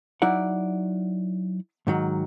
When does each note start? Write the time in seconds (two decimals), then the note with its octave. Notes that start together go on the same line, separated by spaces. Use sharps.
0.22 F#3 D#4 E4 D5 F#5
1.87 G#2 D#3 F#3